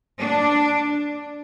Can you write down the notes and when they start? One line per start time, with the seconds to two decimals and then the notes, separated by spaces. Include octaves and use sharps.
0.19 D4